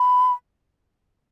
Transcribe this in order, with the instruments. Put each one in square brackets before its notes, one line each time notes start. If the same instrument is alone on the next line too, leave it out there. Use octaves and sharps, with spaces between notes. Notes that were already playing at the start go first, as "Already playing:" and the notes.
Already playing: [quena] B5